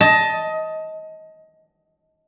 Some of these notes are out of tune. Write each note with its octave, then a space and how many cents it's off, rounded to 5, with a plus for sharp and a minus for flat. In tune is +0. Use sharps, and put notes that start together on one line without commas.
D#5 +20 A5 +0